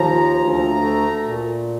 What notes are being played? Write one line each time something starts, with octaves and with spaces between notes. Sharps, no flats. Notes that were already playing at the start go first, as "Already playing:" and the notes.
Already playing: D#2 F3 A#5
D2
A3
A#2